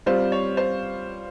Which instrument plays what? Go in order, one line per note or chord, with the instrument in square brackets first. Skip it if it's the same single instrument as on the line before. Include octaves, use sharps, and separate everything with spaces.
[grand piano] G3 C4 F4 [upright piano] C5
[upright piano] C#5
C5